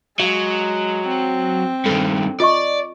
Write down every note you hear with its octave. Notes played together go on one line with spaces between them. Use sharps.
F#3 G#3 F5
C4
G2 D#3 A4
F4 D5 D#5 C#6